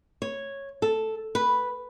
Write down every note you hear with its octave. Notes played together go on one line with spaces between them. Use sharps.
C#5
A4
B4